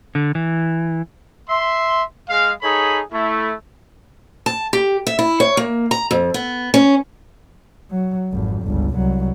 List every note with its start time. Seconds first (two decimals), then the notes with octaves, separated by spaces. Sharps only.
0.15 D3
0.35 E3
1.49 E5 C6
2.28 G#3 F5
2.62 D#4 G#4 A4 C#5 B5
3.12 A3 E4
4.46 A5
4.73 G4
5.07 E5
5.19 E4
5.40 C#5
5.57 A#3
5.91 A#5
6.11 F2
6.34 B3
6.74 C#4
7.90 F#3
8.32 G#1 F2
8.64 G1 C#2
8.95 C2 F#3